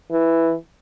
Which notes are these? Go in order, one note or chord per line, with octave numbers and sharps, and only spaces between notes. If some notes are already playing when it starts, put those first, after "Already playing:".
E3